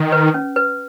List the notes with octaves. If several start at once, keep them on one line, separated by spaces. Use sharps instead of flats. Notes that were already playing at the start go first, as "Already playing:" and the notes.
Already playing: D#3
B4
C#4
B4